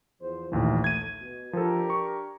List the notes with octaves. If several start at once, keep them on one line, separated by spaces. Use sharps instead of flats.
E2 F3 C5
A#1 D#2 E3 A3
G#6 D#7
B2
F3 D4 G4 A4 A#4
C#6